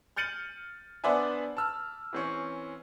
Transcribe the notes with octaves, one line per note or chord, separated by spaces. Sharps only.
F6 G6 A6 C#7 D#7 F#7
B3 D4 C5 D5 E5 G#5
A5 E6 F6
E3 C4 C#4